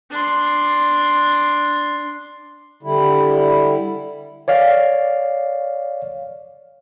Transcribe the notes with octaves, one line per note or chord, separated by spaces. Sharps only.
D4 C6
D3 G3 E4
C#5 D5 F5